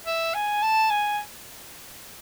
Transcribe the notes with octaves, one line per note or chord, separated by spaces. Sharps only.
E5
G#5
A5
G#5